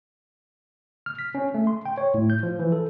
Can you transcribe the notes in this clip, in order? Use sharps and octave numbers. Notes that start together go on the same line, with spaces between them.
F6
B6
C#4
A3
C6
G5
C#5
A2
G6
F3
E3
A4